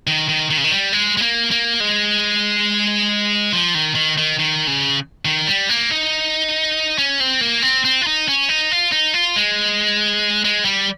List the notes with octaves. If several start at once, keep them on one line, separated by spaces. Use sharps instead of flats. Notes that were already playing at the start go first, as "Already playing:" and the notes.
D#3
D#3
D#3
C#3
D#3
G3
G#3
G#3
A#3
A#3
G#3
F3
D#3
D#3
D#3
D#3
C#3
D#3
G3
A#3
D#4
C#4
C4
A#3
C4
C4
F4
D#4
C#4
D#4
F4
D#4
F4
G#3
G#3
G3